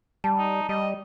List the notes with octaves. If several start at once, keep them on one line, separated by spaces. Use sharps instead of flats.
G3 A5
D#4
G3 D#5